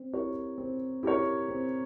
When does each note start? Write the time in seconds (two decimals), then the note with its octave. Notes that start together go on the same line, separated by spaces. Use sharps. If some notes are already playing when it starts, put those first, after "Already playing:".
Already playing: C4
0.13 E4 G4 A#4 C#5
0.58 C4
1.03 E4 G4 A#4 C#5
1.49 C4